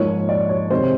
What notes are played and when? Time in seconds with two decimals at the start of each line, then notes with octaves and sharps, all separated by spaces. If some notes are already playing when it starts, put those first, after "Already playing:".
Already playing: G#2 F3 A#3 C#5
0.29 D5
0.49 C#5
0.70 C3 D#3 G#3 C5